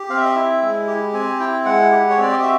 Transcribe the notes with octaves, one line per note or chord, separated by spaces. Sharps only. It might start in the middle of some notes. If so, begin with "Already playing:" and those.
Already playing: G4
C4 F5
E5
D#5
E4 E5
G#3
G4
C4 G#5
E4 G5
G#3 F#5
G4
C#5
C4 D5
D#5
F#4 E5